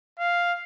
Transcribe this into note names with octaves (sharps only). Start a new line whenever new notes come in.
F5